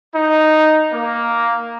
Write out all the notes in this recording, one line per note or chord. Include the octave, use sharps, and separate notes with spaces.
D#4
A#3